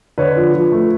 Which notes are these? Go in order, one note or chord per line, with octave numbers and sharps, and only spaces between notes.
D3 B4 C#5
F3
F3
A3